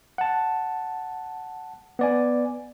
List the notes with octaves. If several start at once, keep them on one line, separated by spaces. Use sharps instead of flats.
F#5 A5
B3 D5 G#5